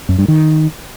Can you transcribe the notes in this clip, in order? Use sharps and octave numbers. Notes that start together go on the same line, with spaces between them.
F#2
G2
D#3